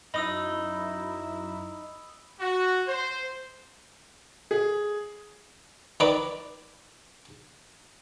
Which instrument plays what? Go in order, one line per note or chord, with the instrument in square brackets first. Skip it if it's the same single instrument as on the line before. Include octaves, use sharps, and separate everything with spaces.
[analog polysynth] F#2 E4 [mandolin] D#4 [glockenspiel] B5 D#6 E6
[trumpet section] F#4
C5
[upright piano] G#4
[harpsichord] D#3 B4 D5 A#5 B5 D6